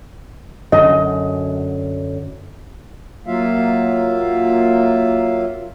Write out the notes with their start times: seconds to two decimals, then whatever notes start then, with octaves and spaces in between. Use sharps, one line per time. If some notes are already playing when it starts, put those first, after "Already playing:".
0.72 F#2 D3 F#3 D#5
3.27 F#3 A#3 F4 E5 F5